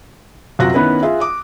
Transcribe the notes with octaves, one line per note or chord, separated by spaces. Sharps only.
F#2 C3 F4 F#4 F#6 A#6
D#3 B3 C#4 E4 B4
F4 G#4 E5
D6 D#6